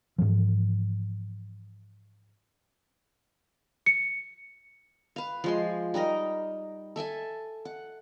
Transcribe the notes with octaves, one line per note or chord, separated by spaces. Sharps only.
G#2 C#3 E3 F3
C#7
B4 F5
F3 G#3 C6
G3 D#4 A#4 D#5
A4 E5 G#5 A5
F#5